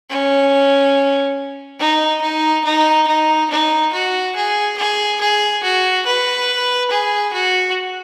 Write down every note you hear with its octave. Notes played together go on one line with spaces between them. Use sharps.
C#4
D#4
D#4
D#4
D#4
D#4
F#4
G#4
G#4
G#4
F#4
B4
G#4
F#4